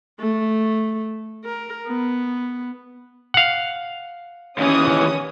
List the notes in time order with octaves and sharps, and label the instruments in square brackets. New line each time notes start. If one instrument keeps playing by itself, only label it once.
[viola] A3
A#4
B3
[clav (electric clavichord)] F5 F#5
[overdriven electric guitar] D#2 E3 [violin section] C#4 D#6